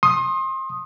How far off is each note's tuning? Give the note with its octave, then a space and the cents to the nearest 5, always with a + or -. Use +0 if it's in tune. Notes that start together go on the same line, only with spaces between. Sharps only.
C6 +30 D#6 +0